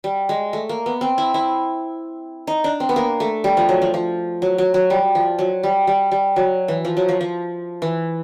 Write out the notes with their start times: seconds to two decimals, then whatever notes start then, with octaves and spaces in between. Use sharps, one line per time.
0.04 G3
0.29 G#3
0.53 A3
0.69 A#3
0.86 B3
1.01 C4
1.18 E4
1.34 E4
2.47 D#4
2.64 D4
2.80 C4
2.89 B3
2.96 A#3
3.20 A3
3.44 G3
3.57 F3
3.69 F#3
3.82 F3
3.94 F3
4.42 F#3
4.58 F#3
4.74 F#3
4.90 G3
5.15 F3
5.39 F#3
5.63 G3
5.87 G3
6.11 G3
6.36 F#3
6.68 E3
6.85 F3
6.97 F#3
7.09 F3
7.21 F3
7.82 E3